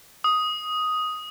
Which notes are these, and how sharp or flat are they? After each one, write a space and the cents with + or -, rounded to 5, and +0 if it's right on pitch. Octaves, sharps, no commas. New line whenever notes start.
D#6 +5